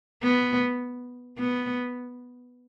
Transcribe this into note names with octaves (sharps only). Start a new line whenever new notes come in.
B3
B3